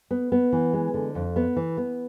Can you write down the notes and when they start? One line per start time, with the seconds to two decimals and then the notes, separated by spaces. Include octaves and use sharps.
0.11 B3
0.32 B3
0.52 E3
0.73 G#3
0.94 D3
1.15 F2
1.36 B3
1.56 E3
1.77 B3